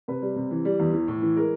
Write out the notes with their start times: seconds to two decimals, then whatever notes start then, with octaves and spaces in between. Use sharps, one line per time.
0.08 C3 B4
0.22 G3
0.36 C3
0.51 E3
0.65 G3
0.80 E2
0.93 E3
1.08 A2
1.22 E3
1.36 G#3 A#4